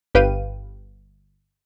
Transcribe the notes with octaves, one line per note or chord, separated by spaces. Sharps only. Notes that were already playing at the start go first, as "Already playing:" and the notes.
G1 G4 B4 F5 G5 D#7